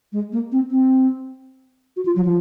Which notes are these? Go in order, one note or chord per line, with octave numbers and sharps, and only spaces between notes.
G#3
A#3
C4
C4
F#4
F4
F#3
F3